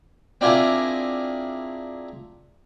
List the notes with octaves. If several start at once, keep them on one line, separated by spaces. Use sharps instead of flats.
C4 D4 E4 F4 G#4 A#4